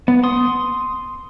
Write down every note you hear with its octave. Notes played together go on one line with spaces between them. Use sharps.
B3
C6 D#6